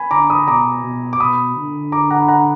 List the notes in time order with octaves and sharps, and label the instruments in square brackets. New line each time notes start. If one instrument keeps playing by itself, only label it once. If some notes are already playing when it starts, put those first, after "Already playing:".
Already playing: [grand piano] G#5 B5
[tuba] D3 [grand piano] A#5 D6
[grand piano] B5 D#6
[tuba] B2 [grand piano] A#5 D6
[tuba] B2
[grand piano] D6
[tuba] B2 [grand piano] B5 D#6
[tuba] D3
[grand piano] A#5 D6
F#5 A#5
B5
F#5 A#5